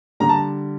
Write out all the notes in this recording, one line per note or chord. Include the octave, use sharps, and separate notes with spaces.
D3 G3 A#5
A5